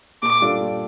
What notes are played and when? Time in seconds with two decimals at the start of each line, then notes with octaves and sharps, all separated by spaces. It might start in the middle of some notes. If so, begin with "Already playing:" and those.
0.22 A#2 D6
0.41 G3 D4 F4 A4
0.61 A#2